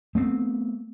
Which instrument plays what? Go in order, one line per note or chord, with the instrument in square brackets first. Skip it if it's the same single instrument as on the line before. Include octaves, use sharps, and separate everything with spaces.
[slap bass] A3 B3 C4